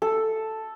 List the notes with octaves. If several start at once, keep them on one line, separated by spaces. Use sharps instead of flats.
A4